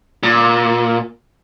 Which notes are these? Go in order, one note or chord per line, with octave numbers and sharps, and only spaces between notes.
A#2